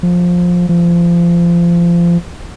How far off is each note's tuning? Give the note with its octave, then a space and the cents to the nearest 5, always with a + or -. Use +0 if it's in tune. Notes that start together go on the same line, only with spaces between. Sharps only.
F3 +15
F3 -25